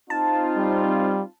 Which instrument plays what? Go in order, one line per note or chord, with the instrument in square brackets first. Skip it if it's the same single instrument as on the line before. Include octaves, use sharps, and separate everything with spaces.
[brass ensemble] C4 D#4 F4 [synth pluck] A5
[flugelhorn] G3